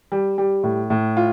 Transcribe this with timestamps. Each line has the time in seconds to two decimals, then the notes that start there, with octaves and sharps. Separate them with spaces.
0.12 G3
0.38 G3
0.64 A2
0.90 A2
1.17 F4